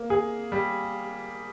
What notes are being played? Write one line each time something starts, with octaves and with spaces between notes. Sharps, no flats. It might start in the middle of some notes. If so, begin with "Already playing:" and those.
Already playing: A#3
G#4
G3